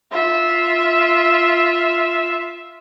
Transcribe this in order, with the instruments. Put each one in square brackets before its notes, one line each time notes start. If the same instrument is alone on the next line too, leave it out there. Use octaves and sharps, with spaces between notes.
[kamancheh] F4 E5